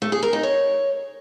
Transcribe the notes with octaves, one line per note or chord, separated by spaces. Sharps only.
A3
G#4
A#4
D#4
C#5